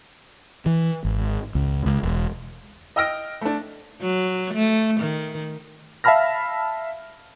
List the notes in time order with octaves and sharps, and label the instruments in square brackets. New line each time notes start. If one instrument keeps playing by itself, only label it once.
[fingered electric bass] E3
G#1
C#2
C#2
E1
[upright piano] D#5 G5 E6 F6 A#6 D7
A3 D4
[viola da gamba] F#3
A3
D#3
[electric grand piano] E5 F5 A5 B5 F6 A#6